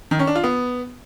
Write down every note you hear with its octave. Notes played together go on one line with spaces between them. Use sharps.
D#3
C#4
D4
F4
B3